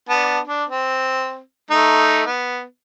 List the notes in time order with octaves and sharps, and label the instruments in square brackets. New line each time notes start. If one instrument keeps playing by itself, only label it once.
[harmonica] B3 D4 A5
D4
C4
A3 D#4
B3